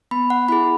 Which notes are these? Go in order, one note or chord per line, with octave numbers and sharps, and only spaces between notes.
B3 B5
F#5
E4 G#4 B5